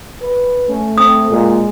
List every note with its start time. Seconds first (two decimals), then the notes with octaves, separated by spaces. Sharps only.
0.21 B4
0.69 A3 C#4
0.98 C4 D#6
1.31 A#2 G#3